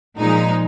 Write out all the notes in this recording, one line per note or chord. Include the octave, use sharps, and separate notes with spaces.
A#2 F3 G#3 D#4